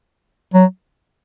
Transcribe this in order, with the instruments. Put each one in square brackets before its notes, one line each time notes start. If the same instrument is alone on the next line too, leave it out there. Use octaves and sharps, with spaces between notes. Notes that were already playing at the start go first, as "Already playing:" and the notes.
[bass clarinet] F#3